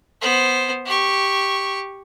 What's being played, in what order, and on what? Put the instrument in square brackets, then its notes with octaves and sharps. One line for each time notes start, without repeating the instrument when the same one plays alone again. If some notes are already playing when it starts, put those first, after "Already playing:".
[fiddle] B3 C5
G4 C#6